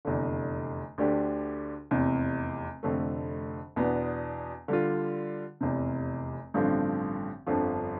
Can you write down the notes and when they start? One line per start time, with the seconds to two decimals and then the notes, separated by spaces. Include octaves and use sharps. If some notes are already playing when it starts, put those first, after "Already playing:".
0.05 F1 E2 D3
0.98 D2 D3 A3 D4 G4
1.91 F1 E2 C3
2.83 F1 F2 D3 A3
3.76 E2 B2 B3 D4
4.68 D3 G3 D4 F4
5.61 F1 E2 C3
6.54 A1 G2 D3 F3 C4
7.47 G1 F2 D3 F3